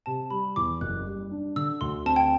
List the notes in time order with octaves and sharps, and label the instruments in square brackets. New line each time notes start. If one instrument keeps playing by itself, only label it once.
[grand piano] C3 [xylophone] A5
[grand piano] G3 [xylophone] B5
[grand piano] E2 [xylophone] D6
[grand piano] F#1 [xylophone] F#6
[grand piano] G3
D4
[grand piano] D3 [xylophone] E6
[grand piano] D2 [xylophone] C6
[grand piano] C4 [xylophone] A5
[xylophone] G5